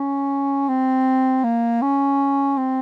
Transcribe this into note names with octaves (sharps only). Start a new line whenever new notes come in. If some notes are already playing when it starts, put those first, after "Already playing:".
Already playing: C#4
C4
A#3
C#4
C4